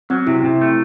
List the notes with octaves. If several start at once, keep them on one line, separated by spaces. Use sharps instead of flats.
F#3 C4
C3 E4
C3
A3